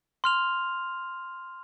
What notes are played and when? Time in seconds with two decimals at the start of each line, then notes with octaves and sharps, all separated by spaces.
0.24 C6 F6 F7